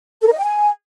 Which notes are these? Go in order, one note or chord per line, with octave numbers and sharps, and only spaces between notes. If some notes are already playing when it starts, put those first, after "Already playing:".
A4
A#4
D#5
G5
G#5